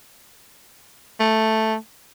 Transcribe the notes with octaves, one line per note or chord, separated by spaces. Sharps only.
A3